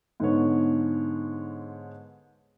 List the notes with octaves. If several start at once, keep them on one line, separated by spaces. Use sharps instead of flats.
G#2 D3 B3 C#5